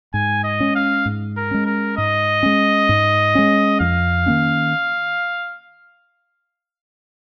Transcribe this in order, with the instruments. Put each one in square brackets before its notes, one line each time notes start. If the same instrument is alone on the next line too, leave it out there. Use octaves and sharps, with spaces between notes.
[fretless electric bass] G#2 [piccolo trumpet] G#5
[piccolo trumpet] D#5
[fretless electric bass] G#3 C#4
[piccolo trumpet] F5
[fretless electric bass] G#2
[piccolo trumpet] A#4
[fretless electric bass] G#3 C#4
[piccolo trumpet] A#4
[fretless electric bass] G#2 [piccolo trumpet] D#5
[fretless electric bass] G#3 C#4
G#2
G#3 C#4
[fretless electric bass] F2 [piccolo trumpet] F5
[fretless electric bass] D#3 A#3 C#4